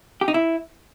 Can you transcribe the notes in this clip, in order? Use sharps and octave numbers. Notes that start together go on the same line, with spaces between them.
G4
D#4
E4